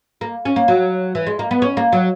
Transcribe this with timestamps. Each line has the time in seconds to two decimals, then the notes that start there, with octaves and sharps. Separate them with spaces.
0.21 A#3
0.45 C#4
0.56 A#3
0.68 F#3
1.15 E3
1.27 G#3
1.39 A#3
1.51 B3
1.62 C#4
1.77 A#3
1.93 F#3